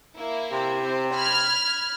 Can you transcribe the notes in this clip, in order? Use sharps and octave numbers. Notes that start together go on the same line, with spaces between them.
A#3 E4
C3
C4
B5 F6 G#6